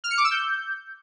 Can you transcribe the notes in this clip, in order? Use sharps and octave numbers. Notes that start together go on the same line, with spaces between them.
F6
C#7
D6
E6
G6